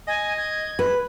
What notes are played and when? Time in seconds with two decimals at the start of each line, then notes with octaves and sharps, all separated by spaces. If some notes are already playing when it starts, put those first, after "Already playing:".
0.08 D#5 G#5
0.37 G#6
0.79 B4